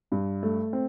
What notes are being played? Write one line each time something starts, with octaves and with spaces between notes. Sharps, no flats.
G2
A3
C4